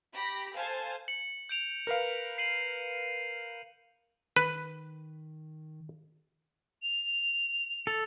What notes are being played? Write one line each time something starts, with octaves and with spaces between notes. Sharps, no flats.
G4 B5 A#6
A4 C5 F5 G#5 A5
C#7 F#7
G6 D7 F7
A#4 B4 F5
C7 D#7 F#7
D#3 B4
F7
A4